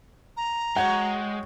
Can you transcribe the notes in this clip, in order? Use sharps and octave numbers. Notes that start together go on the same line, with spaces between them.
A#5
G#3 F#4 C#5 F#5 G5